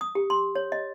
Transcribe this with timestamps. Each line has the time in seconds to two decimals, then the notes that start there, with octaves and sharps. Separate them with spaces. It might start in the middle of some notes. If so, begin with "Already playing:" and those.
0.01 D#6
0.15 G4
0.30 C6
0.55 C#5
0.72 D#5